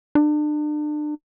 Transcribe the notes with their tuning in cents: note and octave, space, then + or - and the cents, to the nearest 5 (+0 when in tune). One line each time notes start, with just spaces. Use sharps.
D4 +35